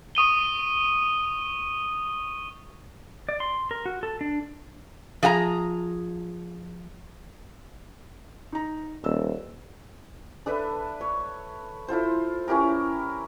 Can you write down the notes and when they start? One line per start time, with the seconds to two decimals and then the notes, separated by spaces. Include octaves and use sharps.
0.15 C#6 D#6 D#7 G7
3.29 D5
3.40 C6
3.71 A#4
3.86 F#4
4.03 A4
4.21 D4
5.23 F3 G#4 F#5 A#5
8.52 D#4 A#5
9.04 D#1 E6
10.46 D4 A4 B4 E5
11.01 C#5
11.88 E4 F4 A4 C5
12.48 C#4 E4 G4 A#4